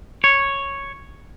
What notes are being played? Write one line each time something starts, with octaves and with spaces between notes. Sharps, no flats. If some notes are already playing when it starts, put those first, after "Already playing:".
C#5